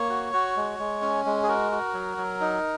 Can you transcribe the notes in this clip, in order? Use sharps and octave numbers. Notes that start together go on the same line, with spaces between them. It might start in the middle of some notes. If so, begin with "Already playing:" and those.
Already playing: A#3 C#5
F#4
F#4
G#3
G#3
C#4
G#3
G#4
F#4 A#4
F#4
F#3
F#3
D#4